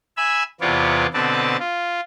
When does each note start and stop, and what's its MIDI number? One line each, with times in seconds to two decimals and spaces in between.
0.17 0.43 76
0.17 0.43 80
0.17 0.43 83
0.17 0.43 88
0.61 1.06 40
0.61 1.06 48
0.61 1.06 59
0.61 1.06 65
0.61 1.06 73
0.61 1.06 74
1.13 1.57 47
1.13 1.57 50
1.13 1.57 60
1.13 1.57 71
1.13 1.57 74
1.13 1.57 81
1.59 2.00 65